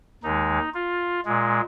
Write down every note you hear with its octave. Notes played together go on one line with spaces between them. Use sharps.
D#2 D#3 G#3 D#4
F4
A#2 G#3